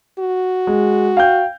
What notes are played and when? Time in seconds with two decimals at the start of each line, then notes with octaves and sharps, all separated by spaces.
0.19 F#4
0.67 G#3
1.17 F5 G5 G6